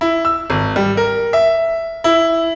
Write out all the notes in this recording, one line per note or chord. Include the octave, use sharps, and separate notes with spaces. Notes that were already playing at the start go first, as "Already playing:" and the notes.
E4
E6
G#1
G3
A#4
E5
E4